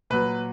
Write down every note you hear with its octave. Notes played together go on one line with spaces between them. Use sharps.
A#2 F#3 B4